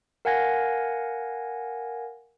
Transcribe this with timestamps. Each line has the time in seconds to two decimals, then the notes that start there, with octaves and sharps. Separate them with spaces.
0.25 A#4 F5 F#5 G#5 G#6 A#6